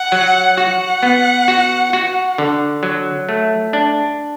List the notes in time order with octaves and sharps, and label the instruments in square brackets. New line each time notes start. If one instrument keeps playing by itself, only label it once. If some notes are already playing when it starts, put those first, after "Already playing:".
Already playing: [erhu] F#5
[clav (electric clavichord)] F#3
[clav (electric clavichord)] F#4 [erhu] F#5
[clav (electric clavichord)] B3
F#4
F#4
D3
F#3
A3
D4